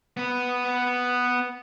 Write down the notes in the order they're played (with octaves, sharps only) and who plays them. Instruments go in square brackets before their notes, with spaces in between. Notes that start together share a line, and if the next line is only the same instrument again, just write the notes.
[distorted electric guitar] B3 B4